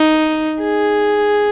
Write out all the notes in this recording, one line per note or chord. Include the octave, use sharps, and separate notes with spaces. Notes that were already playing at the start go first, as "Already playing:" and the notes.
Already playing: D#4
G#4